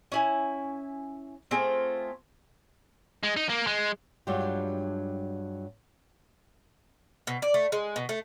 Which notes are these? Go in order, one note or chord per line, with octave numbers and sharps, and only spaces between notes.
C#4 E4 G#5
A3 C4 F4 G#4
G#3
D#4
A#3
G#3
G2 F#3 G#3 D4 F4 G4
B2
D5
A3
G#3
B2
A3